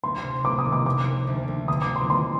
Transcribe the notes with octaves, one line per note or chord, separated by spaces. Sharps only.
D2 C6
C3
C2 D6
D#6
D#3
D6
F3 D6
A#3
D2
D2
D3 D#6
D6
C4
C6
D#3 C6